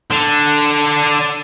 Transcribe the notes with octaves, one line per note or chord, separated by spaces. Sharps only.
D3 D4